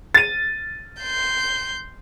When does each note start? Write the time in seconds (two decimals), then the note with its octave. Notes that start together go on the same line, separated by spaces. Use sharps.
0.14 A6 D#7
1.01 C6 G6